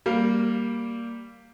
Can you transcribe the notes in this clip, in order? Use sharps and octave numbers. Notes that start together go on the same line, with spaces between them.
G3 A#3